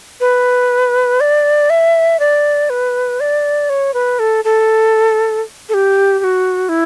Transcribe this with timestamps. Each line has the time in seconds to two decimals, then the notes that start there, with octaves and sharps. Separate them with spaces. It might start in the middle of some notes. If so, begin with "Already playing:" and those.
0.21 B4
1.20 D5
1.70 E5
2.20 D5
2.70 B4
3.20 D5
3.70 C#5
3.94 B4
4.19 A4
4.45 A4
5.69 A4
5.74 G4
6.19 G4
6.24 F#4
6.69 E4